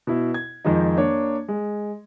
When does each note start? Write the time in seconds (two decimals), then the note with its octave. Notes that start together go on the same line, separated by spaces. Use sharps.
0.07 B2 E4
0.34 G#6
0.65 F2 D#3 F3 G#3 D#4
0.97 A#3 D4 C#5
1.48 G#3